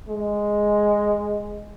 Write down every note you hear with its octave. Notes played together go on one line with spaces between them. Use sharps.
G#3